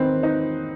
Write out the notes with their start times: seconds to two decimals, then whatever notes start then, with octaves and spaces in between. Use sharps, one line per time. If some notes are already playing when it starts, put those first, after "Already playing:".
Already playing: E1 D#3 C4 B4
0.23 D#4